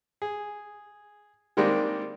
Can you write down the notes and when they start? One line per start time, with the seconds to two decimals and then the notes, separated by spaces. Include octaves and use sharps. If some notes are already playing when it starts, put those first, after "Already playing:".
0.22 G#4
1.57 D#3 G3 G#3 A#3 C4 D4